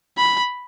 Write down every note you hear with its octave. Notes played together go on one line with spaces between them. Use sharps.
B5